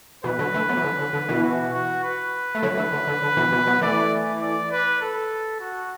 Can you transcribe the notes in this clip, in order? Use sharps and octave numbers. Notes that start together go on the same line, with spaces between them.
B2 E3 B4
D3 F#3
E3 A3
F#3 B3
E3
D3
D3
D3
B2 E3
F#4
F#4
B4
A3
D3 F#3
E3 A3
D3
D3
D3
B2 E3
B2 E3
F#3 B3
E3 A3 D5
D5
B4
A4
F#4